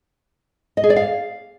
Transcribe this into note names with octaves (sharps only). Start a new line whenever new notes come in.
D#5
G#4
D5
F5